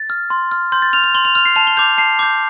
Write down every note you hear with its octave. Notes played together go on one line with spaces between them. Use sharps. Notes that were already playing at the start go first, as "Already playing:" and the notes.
Already playing: A6
F6
C6
F6
C6 G6
A6
F6 F7
F7
C6 G7
F7
F6 F7
C7
A5 F7
G7
D6 G6 F7
A5 C7
D6 G6